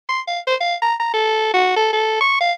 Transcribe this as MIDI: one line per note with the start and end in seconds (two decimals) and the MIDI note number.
0.09 0.20 84
0.28 0.40 77
0.47 0.56 72
0.61 0.75 77
0.82 0.95 82
1.00 1.13 82
1.14 1.53 69
1.54 1.72 66
1.77 1.91 69
1.93 2.21 69
2.21 2.37 85
2.41 2.52 77